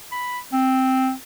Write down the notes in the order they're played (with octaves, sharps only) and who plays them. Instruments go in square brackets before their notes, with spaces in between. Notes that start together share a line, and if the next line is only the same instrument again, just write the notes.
[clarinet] B5
C4